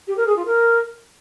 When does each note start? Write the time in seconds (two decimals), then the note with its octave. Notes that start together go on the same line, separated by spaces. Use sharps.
0.08 G4
0.17 A#4
0.27 G#4
0.36 F4
0.46 A#4